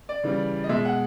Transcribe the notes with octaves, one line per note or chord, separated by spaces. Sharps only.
D5
C#3 E3 G3
D#5
B2 G#3 E5
F#5